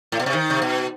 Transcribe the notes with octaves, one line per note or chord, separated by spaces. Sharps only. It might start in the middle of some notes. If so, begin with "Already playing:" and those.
A2
B2
C3
D#3
C3
B2